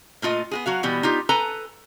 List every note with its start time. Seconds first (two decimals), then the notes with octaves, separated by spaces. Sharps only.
0.22 A#2 A3 F4 D#5
0.51 B3 F#4 G#4
0.66 F#3 F#4 F5
0.83 B2 E3 G3 B3
1.03 D#4 F4 G4
1.29 A4 B4 G#5 A#5